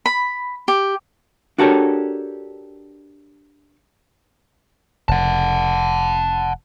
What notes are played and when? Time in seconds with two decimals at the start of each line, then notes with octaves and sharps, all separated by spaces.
0.06 B5
0.68 G4
1.58 D4 F#4 G4 A4 A#4 C#5
5.09 F1 F#5 A5